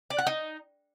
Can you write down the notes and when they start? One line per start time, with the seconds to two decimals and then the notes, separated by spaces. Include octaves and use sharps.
0.10 D5
0.18 F#5
0.27 D#4